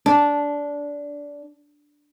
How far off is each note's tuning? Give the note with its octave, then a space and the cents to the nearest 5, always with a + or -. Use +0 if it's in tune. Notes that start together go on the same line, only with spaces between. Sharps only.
D4 -15